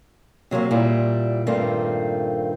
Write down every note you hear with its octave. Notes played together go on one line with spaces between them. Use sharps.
C3 F#3 G3 A#3
A#2 G3 E4
G2 A#2 D#3 A3 A#3 C4